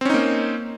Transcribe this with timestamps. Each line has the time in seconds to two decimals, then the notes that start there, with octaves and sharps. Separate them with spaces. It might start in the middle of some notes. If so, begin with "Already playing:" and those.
0.01 C4
0.05 C#4
0.10 D#4
0.14 A#3